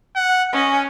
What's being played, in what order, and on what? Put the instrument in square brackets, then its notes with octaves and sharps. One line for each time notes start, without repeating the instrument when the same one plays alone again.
[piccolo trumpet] F#5
[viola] C#4 [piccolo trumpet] D#5 [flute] G#5